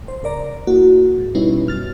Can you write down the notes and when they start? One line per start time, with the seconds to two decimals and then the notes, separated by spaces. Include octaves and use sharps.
0.04 G#1 C5
0.23 C#2 A#4 D5 A#5
0.67 A#3 E4 F#4
1.18 G#2
1.35 B2 G3 B3 C#4 D#4 E4
1.67 F#2 F6 A6